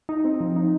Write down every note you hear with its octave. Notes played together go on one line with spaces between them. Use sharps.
D#4
C4
F3
D#4